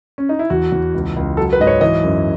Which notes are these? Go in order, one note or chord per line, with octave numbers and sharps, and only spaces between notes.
C#4
D#4
E4
E2 F#4
E2
C#2
C#2
F#3 A4
B4
G#2 D#5
C#5
E3 D#5
F#2